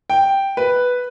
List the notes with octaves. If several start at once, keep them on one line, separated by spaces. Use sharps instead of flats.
G5
B4